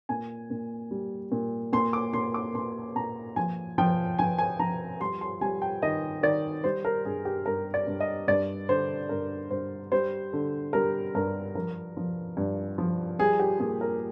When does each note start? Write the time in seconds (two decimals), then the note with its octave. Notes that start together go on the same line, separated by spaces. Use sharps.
0.09 A#2 G#5
0.50 A#2
0.91 G3
1.32 A#2
1.73 A#2 C6
1.93 D6
2.13 A#2 C6
2.34 D6
2.54 A#2 C6
2.96 A#2 A#5
3.36 F3 G#5
3.78 F3 G5
4.19 F3 G#5
4.38 G#5
4.59 F3 A#5
5.00 G3 C6
5.21 C6
5.41 G3 G#5
5.62 G5
5.82 D#3 D#5
6.23 D#3 D5
6.64 G3 C5
6.85 A#4
7.05 G2 G#4
7.25 G4
7.46 G2 A#4
7.74 D5
7.87 G2
8.00 D#5
8.28 G2 D5
8.69 D3 C5
9.09 G2 A#4
9.50 G2 C5
9.92 G3 C5
10.33 D3
10.73 G3 A#4
11.15 G2 A#4
11.55 F3 A#4
11.97 F3
12.37 G2
12.78 F3
13.19 G3 G#4
13.40 G4
13.60 A#2 G#4
13.81 A#4